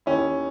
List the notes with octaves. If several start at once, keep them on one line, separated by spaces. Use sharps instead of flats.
D#2 D#3 C#4 E4